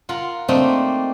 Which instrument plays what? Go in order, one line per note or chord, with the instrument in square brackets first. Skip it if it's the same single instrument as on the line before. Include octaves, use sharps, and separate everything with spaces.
[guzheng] F4 A#4 F#5
A3 A#3 C4 D4 D#4